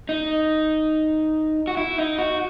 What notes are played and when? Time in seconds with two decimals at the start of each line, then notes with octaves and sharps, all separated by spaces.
0.09 D#4
1.67 F#4
1.77 E4
1.98 D#4
2.18 F#4